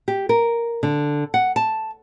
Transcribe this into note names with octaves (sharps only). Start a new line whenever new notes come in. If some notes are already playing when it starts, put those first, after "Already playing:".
G4
A#4
D3
F#5
A5